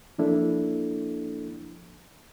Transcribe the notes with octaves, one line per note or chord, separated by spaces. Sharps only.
F3 A#3 D4 E4 A4